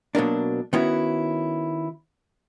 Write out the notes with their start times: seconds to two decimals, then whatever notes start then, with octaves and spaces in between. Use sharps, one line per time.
0.15 B2 F#3 A#3 D4
0.73 D#3 B3 C#4 E4 F#4